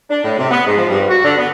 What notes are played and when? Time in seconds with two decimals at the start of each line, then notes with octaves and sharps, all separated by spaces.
0.09 D4
0.25 A2
0.38 C3
0.51 B3
0.64 G#2
0.77 F3
0.90 G2
1.07 F#4
1.22 D3
1.37 B3